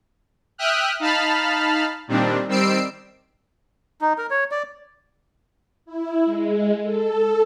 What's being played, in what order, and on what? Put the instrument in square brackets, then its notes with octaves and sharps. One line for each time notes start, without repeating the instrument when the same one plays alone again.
[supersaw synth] E5 G5 D#6 F6 F#6
D#4 F5 A5 B5 F6
A#2 D#3 G3 C4 D4
D#3 G3 C4 E6 C7 D7
[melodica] D#4
A#4
C#5
D5
[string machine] E4
G#3
A4